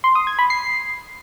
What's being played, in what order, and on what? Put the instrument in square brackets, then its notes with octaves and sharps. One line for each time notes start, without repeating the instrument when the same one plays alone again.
[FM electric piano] C6
D#6
G#6
B5
C7